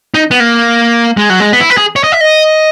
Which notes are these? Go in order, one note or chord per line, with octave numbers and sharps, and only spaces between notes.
D#4
B3
A#3
G#3
F#3
G#3
B3
E4
B4
G#4
C#5
D#5
E5
D#5